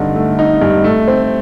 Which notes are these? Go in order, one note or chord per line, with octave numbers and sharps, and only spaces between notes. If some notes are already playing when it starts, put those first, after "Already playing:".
Already playing: G2 D3 D#4
A3
D#4
G2
A3
C4